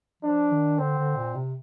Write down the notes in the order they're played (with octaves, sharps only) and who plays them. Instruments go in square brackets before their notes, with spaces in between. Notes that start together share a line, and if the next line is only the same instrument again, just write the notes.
[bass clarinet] F3 [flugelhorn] D4
[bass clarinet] D#3
[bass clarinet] D3 [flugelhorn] C4
[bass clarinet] D3
A#2
C3